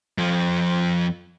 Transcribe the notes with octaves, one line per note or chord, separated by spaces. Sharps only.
F2 F3